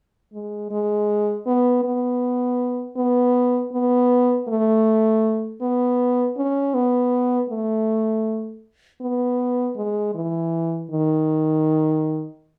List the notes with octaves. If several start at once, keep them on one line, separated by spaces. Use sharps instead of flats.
G#3
G#3
B3
B3
B3
B3
A3
B3
C#4
B3
A3
B3
G#3
E3
D#3